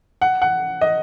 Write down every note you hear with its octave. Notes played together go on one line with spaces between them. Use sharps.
F#5
F#5
D#5